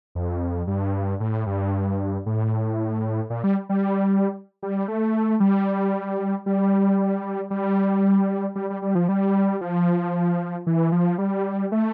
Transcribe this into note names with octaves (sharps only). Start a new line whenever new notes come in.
F2
G2
A2
G2
A2
A#2
G3
G3
G3
A3
G3
G3
G3
G3
G3
G3
F3
G3
F3
E3
F3
G3
A3